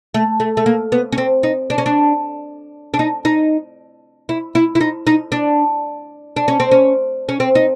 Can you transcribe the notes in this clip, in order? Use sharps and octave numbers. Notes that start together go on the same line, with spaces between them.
A3
A3
A3
A#3
B3
C#4
C4
D#4
D4
C#4
D4
D4
D#4
D#4
E4
E4
E4
D#4
D#4
D4
D4
C#4
C4
C#4
C#4
C4
D#4